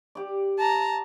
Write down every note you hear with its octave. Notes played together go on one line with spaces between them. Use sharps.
G4 D5
A5 A#5